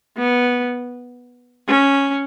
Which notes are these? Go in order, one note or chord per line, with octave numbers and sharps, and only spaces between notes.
B3
C#4